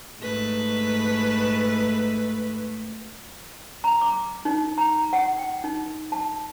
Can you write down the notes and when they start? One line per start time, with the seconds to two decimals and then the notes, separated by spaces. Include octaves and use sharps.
0.21 G#2 A3 B4
3.84 A#5
4.01 D6
4.45 D#4
4.78 A#5
5.13 F#5
5.38 G5
5.64 D#4
6.12 A5